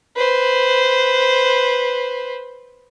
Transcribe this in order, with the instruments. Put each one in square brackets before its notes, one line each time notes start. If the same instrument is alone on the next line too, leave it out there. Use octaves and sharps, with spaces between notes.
[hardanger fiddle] B4 C5